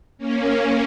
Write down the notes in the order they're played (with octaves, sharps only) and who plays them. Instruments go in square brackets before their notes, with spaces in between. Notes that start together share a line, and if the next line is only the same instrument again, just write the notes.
[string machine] A#3 C#4